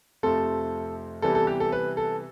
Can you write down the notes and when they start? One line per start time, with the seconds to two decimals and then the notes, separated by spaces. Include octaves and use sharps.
0.23 F2 C3 F3 A3 C4 A4
1.22 C3 E3 G3 B3 A4
1.35 A4
1.47 G4
1.60 A4
1.72 B4
1.97 A4